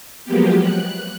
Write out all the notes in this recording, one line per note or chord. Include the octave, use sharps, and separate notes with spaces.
F3 F#3 G#3 A#3 B3 G4
F#6